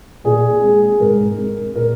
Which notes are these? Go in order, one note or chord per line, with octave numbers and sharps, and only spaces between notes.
A#2 G#4
G#3
G#2 A#4
G#3
A#2 A#4